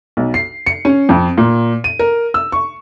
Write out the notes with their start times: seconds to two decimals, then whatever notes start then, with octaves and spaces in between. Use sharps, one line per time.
0.17 B1
0.34 C7
0.66 C#7
0.85 C#4
1.09 F2
1.38 A#2
1.84 D#7
1.99 A#4
2.34 E6
2.52 C#6